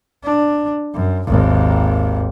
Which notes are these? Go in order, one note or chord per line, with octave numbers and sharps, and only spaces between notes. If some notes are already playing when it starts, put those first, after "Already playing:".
D4
F#2
G#1 D#2